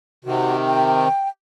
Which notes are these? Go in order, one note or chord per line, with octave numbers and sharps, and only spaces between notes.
C3 D#3 F#4
G5